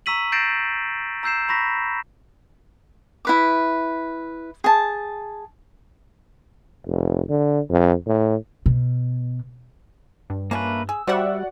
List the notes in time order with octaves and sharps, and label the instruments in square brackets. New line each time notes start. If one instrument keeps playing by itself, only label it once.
[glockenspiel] A#5 C#6 E6 B6 D#7 F#7
G6 A6 A#6 C7 D7 E7
A#5 E6 G6 C7 E7
A#5 B5 C#6 A#6 B6
[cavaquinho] E4 B4 D6
G#4 A5
[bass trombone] F1
D3
F2
A2
[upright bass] B2
[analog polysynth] G2
[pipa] A3 C#4 F4 [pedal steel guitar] A#3 B4
[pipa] G#4 [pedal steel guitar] E6
[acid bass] G3 [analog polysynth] F#4 D5 F#5 [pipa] C5 E5